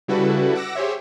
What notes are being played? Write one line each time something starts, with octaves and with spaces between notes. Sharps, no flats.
C#3 G3 E4 F#4 A4 B4
F#5 D6 E6 A#6
G4 G#4 C5 C#5 E5